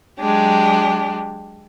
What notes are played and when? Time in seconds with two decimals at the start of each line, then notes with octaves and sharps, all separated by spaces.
0.19 F#3 G#3 D4 G4